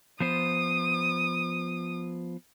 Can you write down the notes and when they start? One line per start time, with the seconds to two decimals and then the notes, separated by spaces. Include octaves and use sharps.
0.20 F3 B3 C5 D#6